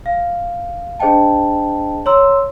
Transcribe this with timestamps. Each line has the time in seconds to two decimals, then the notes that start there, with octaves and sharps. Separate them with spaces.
0.06 F5
1.00 D4 G#4 C5 D#5 G5 A5
2.06 C#5 A#5 C6 E6